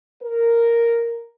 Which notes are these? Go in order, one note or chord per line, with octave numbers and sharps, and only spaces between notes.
A#4